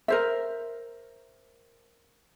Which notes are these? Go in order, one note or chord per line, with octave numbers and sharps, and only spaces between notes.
A#4 C5 E5